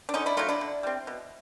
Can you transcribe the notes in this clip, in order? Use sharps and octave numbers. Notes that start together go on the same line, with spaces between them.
D4
D3 C#4 D#4
D4 E4
F#3 A3 D#4 F4
D4 E4
D3
G3 C4
B2